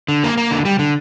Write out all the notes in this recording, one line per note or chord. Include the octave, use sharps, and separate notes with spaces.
D3
A#3
A#3
D3
G3
D3